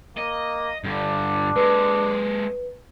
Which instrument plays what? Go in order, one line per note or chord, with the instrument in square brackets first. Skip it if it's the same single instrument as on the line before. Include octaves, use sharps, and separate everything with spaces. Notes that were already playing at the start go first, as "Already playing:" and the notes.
[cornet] A#3 [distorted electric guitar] D#5
[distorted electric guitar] G2 D3 [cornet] D4
[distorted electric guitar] G#3 A4 [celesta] B4